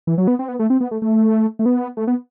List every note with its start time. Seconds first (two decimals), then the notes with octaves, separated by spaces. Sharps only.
0.07 E3
0.18 F#3
0.28 B3
0.39 C4
0.48 B3
0.59 A3
0.70 C4
0.81 B3
0.91 A3
1.02 A3
1.59 A3
1.66 B3
1.97 A3
2.07 B3